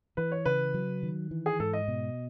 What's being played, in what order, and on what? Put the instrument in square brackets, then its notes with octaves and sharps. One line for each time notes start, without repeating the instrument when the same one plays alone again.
[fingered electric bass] E3 [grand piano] B4
[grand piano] C#5
[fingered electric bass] C#3 [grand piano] B4
[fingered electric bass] F#3
D#3
E3
[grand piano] G#4
[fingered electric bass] G#2 [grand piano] A4
[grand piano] D#5
[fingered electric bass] B2